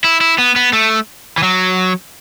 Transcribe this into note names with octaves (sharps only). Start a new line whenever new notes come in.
E4
E4
B3
B3
A3
E3
F#3